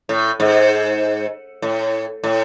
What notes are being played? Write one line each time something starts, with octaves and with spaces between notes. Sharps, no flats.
A2
G#2
A2
A2